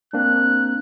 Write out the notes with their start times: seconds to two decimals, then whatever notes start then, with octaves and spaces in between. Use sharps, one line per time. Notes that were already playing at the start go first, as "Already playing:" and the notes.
0.13 A#3 C4 D4 F#6